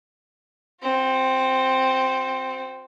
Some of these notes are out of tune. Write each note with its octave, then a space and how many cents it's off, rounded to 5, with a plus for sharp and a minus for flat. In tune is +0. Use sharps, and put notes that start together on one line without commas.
C4 +0 F#4 -45